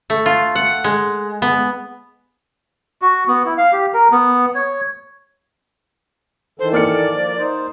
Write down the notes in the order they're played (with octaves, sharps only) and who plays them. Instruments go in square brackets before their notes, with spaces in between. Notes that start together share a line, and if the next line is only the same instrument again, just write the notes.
[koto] A3
F4
F#5
G#3
B3
[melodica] F#4
B3
E4
F5
G4
A#4
B3
C#5
[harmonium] D#3 E3 A4 [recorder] C5
[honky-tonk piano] A#3 F6 C#7 [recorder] D5
[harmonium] F3
D#4 C5